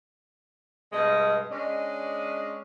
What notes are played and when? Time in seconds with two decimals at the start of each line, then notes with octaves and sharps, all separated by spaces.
0.92 G2 B2 G#3 D#5
1.50 G#3 C#4 D4 D#5